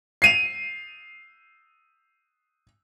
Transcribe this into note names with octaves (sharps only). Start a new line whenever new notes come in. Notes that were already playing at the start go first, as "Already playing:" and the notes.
C7 D#7 F7